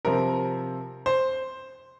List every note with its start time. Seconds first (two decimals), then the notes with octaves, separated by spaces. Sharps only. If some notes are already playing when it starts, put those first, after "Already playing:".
0.05 C3 F3 C4 A#4
1.06 C5